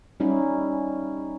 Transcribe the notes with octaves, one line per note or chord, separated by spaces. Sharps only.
G3 C#4 D#4 E4